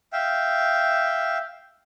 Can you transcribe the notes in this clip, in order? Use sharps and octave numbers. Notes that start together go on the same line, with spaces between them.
E5 F5 G5